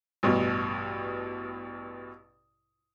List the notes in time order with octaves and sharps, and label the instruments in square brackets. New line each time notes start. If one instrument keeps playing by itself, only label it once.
[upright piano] A1 G2 B2